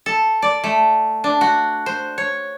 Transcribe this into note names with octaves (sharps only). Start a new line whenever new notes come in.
A4
D5
A3
D4
F#4
C5
C#5